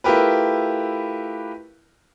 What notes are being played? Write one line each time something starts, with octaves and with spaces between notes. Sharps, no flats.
A3 E4 F4 G4 A#4 B4